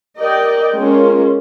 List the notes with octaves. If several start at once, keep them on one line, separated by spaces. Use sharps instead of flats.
G4 A#4 D5 D#5 G5
G#3 A#3 C#4 F4